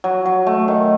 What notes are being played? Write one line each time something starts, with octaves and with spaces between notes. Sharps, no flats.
F#3
F#3
A3
D#3